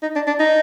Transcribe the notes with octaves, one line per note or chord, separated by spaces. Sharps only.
D#4
D4
D4
D#4